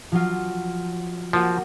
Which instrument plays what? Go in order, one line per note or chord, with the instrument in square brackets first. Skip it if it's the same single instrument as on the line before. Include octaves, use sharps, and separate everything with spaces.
[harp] F3 F#3 F4
[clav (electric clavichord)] F3 [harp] A#3 F#4